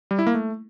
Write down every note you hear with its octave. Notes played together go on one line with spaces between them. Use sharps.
G3
E4
A#3
A3